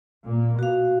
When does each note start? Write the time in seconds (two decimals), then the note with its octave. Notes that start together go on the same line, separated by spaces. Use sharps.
0.25 A#2 A#3
0.59 B2 F#4 F5